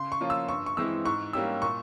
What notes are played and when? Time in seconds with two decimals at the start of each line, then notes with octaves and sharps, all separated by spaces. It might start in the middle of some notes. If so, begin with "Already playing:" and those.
Already playing: C#3 C6
0.12 C#6
0.21 F3 A#3 C#4 F4
0.30 E6
0.48 G2 C#6
0.66 C#6
0.77 E3 G#3 C4 E4 E6
1.05 G#2 C#6
1.33 G3 A#3 C#4 G4 E6
1.62 A#2 C#6